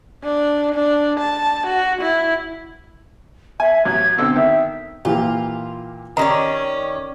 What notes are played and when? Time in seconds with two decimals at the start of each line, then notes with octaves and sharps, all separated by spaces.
0.24 D4
0.75 D4
1.20 A5
1.67 F#4
2.02 E4
3.60 E5 G#5
3.85 A1 F#3 G#6
4.17 B2 D3 C4 E6
4.36 D#3 E5
5.05 A#2 E3 F4 G4
6.17 D#3 C#4 G4 D5 A#5